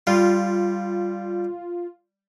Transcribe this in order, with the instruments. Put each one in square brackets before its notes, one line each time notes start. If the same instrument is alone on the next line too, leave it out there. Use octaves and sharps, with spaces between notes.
[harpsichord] G3 [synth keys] F4